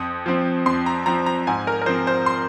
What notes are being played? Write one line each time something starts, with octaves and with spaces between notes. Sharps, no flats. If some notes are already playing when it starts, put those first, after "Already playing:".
Already playing: F2 D#6
F3 C4
F2 C6
A#5
F3 C4 A#5
A#5
G#2 G#5
A#4
A#4
F3 C4 C5
C5
C6